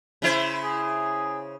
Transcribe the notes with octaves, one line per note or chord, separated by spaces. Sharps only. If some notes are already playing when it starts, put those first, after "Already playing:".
C#3 E4 C5
G#4